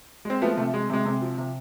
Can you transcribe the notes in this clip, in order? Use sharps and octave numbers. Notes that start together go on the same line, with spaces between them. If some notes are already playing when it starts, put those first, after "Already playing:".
G#3 C4
F3 A3 B3
C3 A3
G#3
C3 G#3
C3
F3
C3